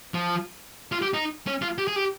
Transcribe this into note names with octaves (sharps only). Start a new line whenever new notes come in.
F3
F4
G4
D#4
C#4
F4
G4
G#4
G4